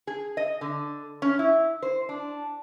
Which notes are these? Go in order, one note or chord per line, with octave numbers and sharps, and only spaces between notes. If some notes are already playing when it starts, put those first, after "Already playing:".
G#4
D#5
D3
C#4
E4
C5
D4